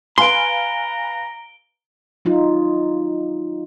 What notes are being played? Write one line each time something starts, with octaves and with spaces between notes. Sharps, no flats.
B4 F5 G#5 A#5 C6 D7 G7
F#3 D#4 F4